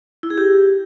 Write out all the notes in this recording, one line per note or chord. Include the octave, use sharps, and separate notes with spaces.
E4
G#4
G4